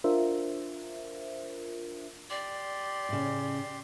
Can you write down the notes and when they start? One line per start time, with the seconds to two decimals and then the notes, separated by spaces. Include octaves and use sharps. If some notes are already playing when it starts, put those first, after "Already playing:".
0.04 D4 F4 A#4 C5 E5
2.30 G4 D5 C6
3.09 A2 C#3